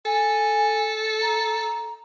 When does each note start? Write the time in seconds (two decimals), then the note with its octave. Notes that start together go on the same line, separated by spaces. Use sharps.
0.06 A4 G#5
1.22 A#5